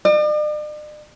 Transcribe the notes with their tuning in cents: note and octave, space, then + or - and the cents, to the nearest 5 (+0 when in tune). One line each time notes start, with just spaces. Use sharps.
D5 +45